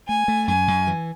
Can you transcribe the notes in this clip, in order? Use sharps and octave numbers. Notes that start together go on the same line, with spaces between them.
A3 G#5
A3
F#2 G#5
F#2
E3